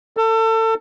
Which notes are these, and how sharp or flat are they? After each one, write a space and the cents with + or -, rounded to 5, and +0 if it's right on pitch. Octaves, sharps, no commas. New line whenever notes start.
A4 +30